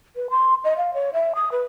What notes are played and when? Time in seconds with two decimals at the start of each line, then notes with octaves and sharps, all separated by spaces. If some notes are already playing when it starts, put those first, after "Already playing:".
0.16 B4
0.30 C6
0.64 D#5
0.77 F5
0.94 C#5
1.13 E5
1.35 D#6
1.52 B4